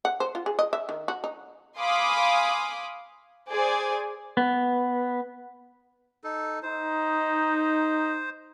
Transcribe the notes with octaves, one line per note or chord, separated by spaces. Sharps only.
F#5
C5
F4
G#4
D#5
E5
D#3
F#4
D#4
F5 G#5 B5 C6 D6 D#6
G#4 C5 D5 G#5
B3
D#4 A4
D#4 C5